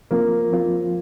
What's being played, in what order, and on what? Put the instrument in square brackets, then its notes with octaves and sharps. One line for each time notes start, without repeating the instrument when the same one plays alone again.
[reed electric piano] F3 C4 F4 [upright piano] A#3
[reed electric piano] F3 C4 F4